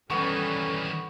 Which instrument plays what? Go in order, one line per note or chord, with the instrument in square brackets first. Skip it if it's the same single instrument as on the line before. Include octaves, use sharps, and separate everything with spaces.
[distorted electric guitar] D#3 E3 [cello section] G3 C#4 [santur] B3 C#6 [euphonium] A4